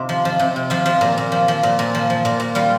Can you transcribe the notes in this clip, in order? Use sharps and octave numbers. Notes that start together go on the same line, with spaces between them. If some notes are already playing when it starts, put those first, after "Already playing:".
Already playing: C3 D#4 F4 F5
F3
F3
C3
C3
F3 F4 F5
F3
A#2
A#2
F3
F3
A#2
A#2
F3
F3
A#2
A#2
G3 F4 F5